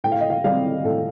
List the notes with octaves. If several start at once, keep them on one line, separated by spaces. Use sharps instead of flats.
A2 G5
F5
D#5
F5
G3 C4 F5
A2 A4